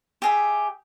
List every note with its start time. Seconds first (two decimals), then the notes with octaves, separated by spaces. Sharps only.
0.22 G4 G#4 E5